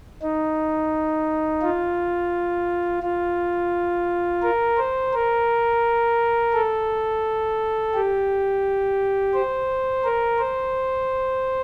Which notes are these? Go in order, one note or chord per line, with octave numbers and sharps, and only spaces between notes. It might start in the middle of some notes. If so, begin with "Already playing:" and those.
D#4
F4
F4
A#4
C5
A#4
A4
G4
C5
A#4
C5